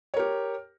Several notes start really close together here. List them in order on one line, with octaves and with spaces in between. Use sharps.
C#5 A#4 G4